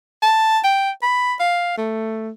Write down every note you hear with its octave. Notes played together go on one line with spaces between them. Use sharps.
A5
G5
B5
F5
A3